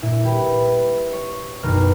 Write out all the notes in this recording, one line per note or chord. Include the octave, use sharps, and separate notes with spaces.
A#2 E4
G3 G4 B4
C#5
F#1 B1 A#4 F6